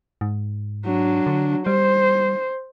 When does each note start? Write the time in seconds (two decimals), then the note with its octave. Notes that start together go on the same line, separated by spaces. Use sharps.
0.21 G#2
0.85 F#3 D4
1.26 D3
1.66 G3 C5